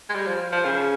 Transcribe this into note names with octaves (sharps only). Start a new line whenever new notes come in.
G#3
G3
F3
F3
C#3